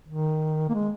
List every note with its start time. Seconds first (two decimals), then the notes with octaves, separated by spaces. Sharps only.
0.08 D#3
0.70 A#3
0.74 G#3